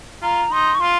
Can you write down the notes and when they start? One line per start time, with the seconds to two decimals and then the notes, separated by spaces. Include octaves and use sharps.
0.22 F4 A#5
0.52 D#4 C6
0.75 C#6
0.81 F4 C6